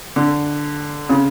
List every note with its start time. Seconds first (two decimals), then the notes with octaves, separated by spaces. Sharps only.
0.16 D3
1.09 C#3